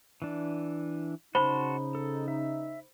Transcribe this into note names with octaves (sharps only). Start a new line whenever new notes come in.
E3 D4
C#3 D#4 F#4 C5 A5 B5 C6 G7
A4
E5